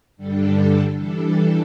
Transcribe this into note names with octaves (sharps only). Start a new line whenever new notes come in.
G2 D3 G3 D4 A4
E3 G3 D4 A4